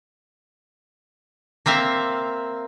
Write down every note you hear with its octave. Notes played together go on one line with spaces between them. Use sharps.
A#3 C4 E5 F5